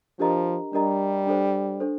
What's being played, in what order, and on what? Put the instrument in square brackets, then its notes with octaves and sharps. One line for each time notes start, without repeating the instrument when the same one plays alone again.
[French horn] F3 [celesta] D4 G4 A#4 D#5 A#5
[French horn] G3 [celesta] D4 G4 A#4 D#5 A#5
[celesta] D4 A4 C5
D4 A4 C5